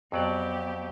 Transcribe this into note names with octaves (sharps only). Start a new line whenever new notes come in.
F2 F#3 B3 G4 D5